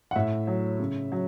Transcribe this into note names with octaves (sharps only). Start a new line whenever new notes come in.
F#5
A2 E5
F#3
C#3
F#3